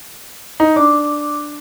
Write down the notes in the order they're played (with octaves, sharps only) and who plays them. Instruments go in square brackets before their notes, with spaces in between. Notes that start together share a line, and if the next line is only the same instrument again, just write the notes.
[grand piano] D#4
[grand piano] D4 [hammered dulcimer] D6